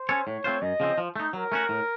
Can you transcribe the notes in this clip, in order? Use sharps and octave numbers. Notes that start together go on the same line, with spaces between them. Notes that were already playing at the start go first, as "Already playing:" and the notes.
Already playing: C5
C#4 A4 C#5
A2 C#5
A3 C4 F4 C5
F#2 D#5
C#3 F3 C4
F3
A3 D#4
F#3 A#4
A3 C#4 F#4
A2